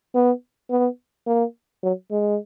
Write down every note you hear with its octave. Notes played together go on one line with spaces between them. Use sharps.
B3
B3
A#3
F#3
G#3